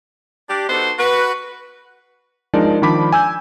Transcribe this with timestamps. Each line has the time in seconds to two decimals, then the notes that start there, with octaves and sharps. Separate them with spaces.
0.49 D4 G4
0.69 B3 D#4 F#4 A4 C5
0.99 F#4 B4
2.54 F3 G#3 D4 D#4 A#4 D5
2.82 D#3 F3 D4 B5 D6 B6
3.13 G#5 E6 G6